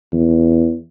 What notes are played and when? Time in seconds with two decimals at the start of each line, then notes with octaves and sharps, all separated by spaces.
0.12 E2